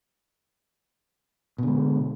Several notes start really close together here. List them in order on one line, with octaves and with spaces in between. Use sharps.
B2 D3 G#3